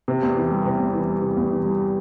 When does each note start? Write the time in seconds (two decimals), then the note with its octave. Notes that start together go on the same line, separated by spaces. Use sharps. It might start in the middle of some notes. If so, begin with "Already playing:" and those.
0.08 C3
0.23 E2
0.36 E3
0.51 G3
0.65 C3
0.79 E2
0.93 E3
1.08 G3
1.22 C3
1.37 E2
1.50 E3
1.66 G3